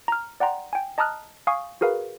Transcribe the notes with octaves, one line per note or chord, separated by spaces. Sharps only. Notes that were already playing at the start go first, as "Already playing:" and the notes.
A#5 F6
D5 F#5 G5 A#5 C6
G5 G#5
D#5 A5 A#5 D#6 F6 F#6
F5 G#5 C#6 D#6
F#4 G#4 A#4 B4 F5